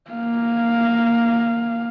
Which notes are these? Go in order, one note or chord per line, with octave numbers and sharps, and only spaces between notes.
A#3 F5